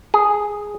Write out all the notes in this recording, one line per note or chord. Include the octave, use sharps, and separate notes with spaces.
G#4